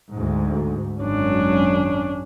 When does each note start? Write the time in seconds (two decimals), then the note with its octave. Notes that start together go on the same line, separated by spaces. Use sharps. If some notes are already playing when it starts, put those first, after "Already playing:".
0.13 D2 G#2
1.02 G#1 F#2 C#4 D4